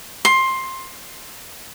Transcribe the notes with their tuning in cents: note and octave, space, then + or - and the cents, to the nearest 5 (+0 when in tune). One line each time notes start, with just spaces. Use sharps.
C6 +15